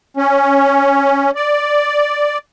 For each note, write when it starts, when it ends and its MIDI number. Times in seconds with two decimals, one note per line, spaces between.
0.17 1.31 61
1.35 2.38 74